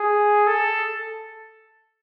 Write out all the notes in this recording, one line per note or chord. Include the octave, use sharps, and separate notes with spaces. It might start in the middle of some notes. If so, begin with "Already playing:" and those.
Already playing: G#4
A4